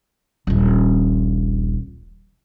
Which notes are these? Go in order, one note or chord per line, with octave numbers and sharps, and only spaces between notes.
D#1 A#1